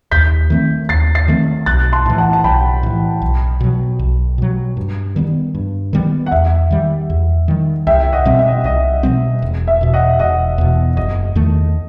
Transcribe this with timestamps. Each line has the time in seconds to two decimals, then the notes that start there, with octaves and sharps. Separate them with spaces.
0.12 D#2 G6 B6
0.50 D#3 A3 C4
0.89 D#2 A6 C7
1.15 A6 C7
1.28 D#3 A3 C4
1.66 B1 F#6 A6
1.92 A5 C6
2.06 A2 E3
2.18 F#5 A5
2.33 A5
2.44 B1 G5 B5
2.83 A2 E3
3.22 B1
3.61 B2 F#3
3.99 B1
4.38 B2 F#3
4.77 G2
5.16 D#3 G3 B3
5.55 G2
5.93 D#3 G3 B3
6.26 F#5
6.31 E2 E5
6.71 D#3 G3
7.10 E2
7.48 D#3 G3
7.87 C2 E5 G5
8.13 D#5 F#5
8.25 B2 G3 C4
8.39 E5
8.48 D#5
8.64 C2 D#5
9.03 B2 G3 C4
9.42 E1
9.68 E5
9.81 E2 B2
9.93 D#5 F#5
10.19 E1 D#5 F#5
10.58 E2 B2
10.97 F#1 D#5
11.35 E2 D#3 A3